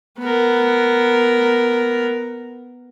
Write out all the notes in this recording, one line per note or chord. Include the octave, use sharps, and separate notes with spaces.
B3 A#4